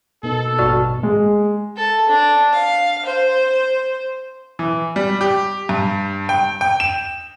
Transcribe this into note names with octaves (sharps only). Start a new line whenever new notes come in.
B2 A#3 B3 D#4 A4
A1 G2 F#4 D5 A5 F6
G#3
A4
D4
F5
C5
E3
G3
G4
G2
G5
G5
E7